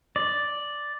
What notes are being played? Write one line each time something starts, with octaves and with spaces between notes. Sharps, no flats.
D5